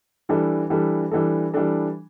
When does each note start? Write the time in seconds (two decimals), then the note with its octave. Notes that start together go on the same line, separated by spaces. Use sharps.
0.29 E3 G3 D4 A4
0.70 E3 G3 D4 A4
1.11 E3 G3 D4 A4
1.54 E3 G3 D4 A4